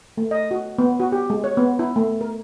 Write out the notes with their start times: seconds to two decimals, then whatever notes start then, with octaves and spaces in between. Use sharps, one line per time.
0.17 A3
0.31 D#5
0.51 F#4
0.78 B3
1.00 F#4
1.12 G4
1.30 G#3
1.44 C#5
1.57 B3
1.79 E4
1.96 A3
2.21 A#4